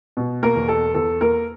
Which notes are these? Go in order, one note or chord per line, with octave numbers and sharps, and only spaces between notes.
B2
A#3 A#4
E2
A4
E2 A4
A#3 A#4